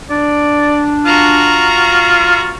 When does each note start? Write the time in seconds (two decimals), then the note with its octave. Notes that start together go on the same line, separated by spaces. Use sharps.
0.10 D4 D5
1.06 F4 F#4 A#5